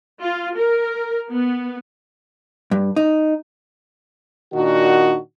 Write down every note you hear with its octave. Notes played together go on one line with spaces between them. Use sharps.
F4
A#4
B3
G2
D#4
A#2 D#3 D4 D#4 F#4